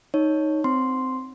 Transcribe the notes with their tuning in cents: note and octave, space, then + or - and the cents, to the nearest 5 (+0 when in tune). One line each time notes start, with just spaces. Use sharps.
D#4 +0 C#5 +0
C4 -10 C6 +0